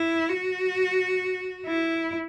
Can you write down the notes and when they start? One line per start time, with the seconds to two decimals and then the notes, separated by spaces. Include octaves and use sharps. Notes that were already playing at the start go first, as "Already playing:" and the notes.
Already playing: E4
0.29 F#4
1.66 E4